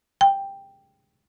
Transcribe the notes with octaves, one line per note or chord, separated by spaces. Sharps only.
G5